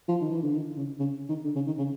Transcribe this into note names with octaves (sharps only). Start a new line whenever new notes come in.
F3
D#3
E3
D3
D#3
C#3
C#3
D#3
D3
C#3
D#3
C#3